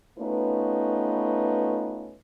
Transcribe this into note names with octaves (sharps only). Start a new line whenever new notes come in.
A3 B3 C#4 D#4 F4 B4